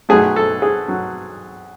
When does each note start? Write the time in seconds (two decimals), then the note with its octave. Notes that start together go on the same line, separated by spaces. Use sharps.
0.09 B1 B2 F#3 A3 G#4
0.36 A4
0.62 G#4
0.88 F#3